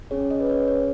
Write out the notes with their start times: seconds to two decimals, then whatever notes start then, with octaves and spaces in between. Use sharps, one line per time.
0.11 C#4 G#4 C#5
0.31 D#5
0.40 B4
0.50 C#5
0.68 C#5